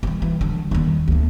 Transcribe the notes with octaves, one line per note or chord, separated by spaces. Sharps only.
D#3 G3
E3
D3 G3
D#2 D4
D2 B3